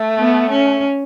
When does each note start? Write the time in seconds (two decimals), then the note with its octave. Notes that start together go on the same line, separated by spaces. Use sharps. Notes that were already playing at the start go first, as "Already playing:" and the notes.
Already playing: A3
0.18 B3
0.50 C#4